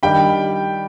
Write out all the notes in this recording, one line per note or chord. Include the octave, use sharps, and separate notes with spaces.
D#3 G3 D4 G4 G5 B5